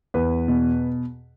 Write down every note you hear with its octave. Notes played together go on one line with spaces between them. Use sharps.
E2 B4
B2